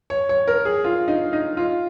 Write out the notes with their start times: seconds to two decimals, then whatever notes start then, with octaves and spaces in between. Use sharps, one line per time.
0.10 C#5
0.29 C#5
0.48 A#4
0.65 G#4
0.84 F4
1.08 D#4
1.33 D#4
1.57 F4